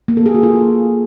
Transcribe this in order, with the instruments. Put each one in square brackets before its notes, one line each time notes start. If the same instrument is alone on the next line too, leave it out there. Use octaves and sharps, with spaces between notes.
[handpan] A#3
A4
G#4
F#4
F4